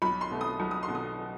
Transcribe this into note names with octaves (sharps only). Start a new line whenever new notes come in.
B1 B5
C6
B2 A3
D#6
B1
D#6
C6
B2 A3
D#6